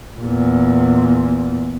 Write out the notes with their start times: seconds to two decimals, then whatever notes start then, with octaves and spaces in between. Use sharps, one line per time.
0.18 E2 A#2